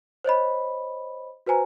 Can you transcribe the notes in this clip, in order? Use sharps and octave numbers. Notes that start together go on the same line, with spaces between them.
C5 C#5 D#5 B5
F#4 B4 C5 G#5 A#5